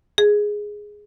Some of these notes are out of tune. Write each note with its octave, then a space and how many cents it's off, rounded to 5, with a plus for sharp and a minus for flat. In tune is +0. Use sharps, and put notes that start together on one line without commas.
G#4 +0